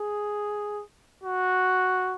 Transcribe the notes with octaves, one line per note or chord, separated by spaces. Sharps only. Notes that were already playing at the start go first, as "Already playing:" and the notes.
Already playing: G#4
F#4